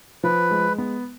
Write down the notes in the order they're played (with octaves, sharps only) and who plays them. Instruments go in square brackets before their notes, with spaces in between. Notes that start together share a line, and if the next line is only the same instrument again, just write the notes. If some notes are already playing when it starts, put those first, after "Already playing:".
[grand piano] F3 [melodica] B4
[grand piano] G#3
B3